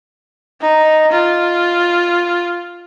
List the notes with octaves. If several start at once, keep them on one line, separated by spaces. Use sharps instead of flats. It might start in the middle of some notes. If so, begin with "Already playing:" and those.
D#4
F4